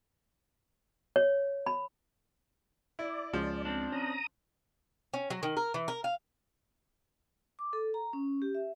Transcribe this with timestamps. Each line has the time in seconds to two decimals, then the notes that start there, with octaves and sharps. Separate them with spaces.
1.16 C#5
1.66 B5
2.99 E4 D5
3.33 C#2 F3 G#3 C#4
3.65 C4 D4
3.92 C#4 A#5 D#6
5.14 C#4
5.30 F#3
5.43 D#3
5.57 A#4
5.74 E3
5.88 A#4
6.04 F5
7.59 D6
7.73 A4
7.94 A#5
8.13 C#4
8.42 G4
8.55 E5